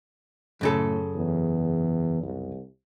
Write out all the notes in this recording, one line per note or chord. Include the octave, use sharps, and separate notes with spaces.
F#2 A2 C#3 A4
E2
C2